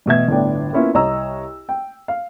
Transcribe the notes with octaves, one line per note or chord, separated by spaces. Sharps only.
A1 B2 E5 G#6
G1 A2 B3 D4 G5
A#3 B3 C#4 E4 F4
C2 C#5 D#5 A#5 E6
G5
F5